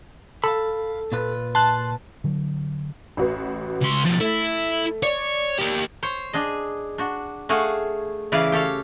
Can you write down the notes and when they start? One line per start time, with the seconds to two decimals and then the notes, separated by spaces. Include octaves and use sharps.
0.44 A4 F5 B5
1.12 A#2 F4 B4
1.55 A5 C6 F#6
2.24 D3 F#3
3.17 A1 F#4 B4
3.81 C#2 C6
4.05 B2 F3 A6
4.20 A3 E4
5.03 C#5 D5
5.58 A#3 G4
6.03 C5 C#5
6.33 D4 G#4 D#5
6.98 D4 F#4
7.49 A3 F#4 G#4 F5 F#5 G#5
8.32 C#3 E3 E4 B4 D5 F5
8.52 G4 A4 C#5 F5